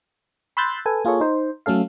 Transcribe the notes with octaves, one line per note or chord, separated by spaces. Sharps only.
B5 C6 E6 F#6 G6 A6
A4 B4 G#5
A#3 F4 G#4 A4 C#5
D#4 C5
F#3 A3 C#4 A4 F5